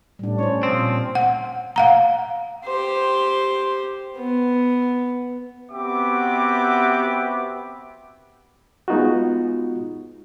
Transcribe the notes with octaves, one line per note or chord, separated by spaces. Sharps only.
A2 G3 D4
C#4 C5 C#5
A#2 F3 C4
F#5
F5 F#5 A#5
G4 C5
B3
B3 C4 F#4 G4 E5 D6
G#3 B3 D#4 F4 F#4